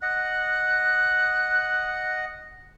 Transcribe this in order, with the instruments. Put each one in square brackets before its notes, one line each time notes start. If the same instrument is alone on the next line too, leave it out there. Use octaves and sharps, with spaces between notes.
[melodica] D#5 F#5 [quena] F#6